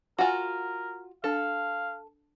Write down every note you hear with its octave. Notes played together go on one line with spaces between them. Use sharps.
F4 F#4 A#4 F#5 G#5
D4 A4 F5